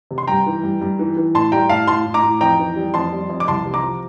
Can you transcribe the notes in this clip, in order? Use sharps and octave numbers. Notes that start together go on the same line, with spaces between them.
C3
C6
G2 G5 A#5
E3
G2
G2
E3
E3
A2 A5 C6
G3 G5 A#5
A2 F5 A5
A2 A5 C6
A2
A#5 D6
A2
F2 G5 A#5
E3
G3
F2 A5 C6
G3
F2
D6
C2 A5 C6
C3
A#5 D6
F3